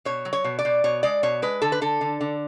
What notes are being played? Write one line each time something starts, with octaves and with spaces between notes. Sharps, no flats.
B2 C#5
F#3
C#5
B2
D5
B2
B2 C#5
G#3 D5
B2 C#5
G#3 B4
D3 A4
B4
D3 A4
D3
D3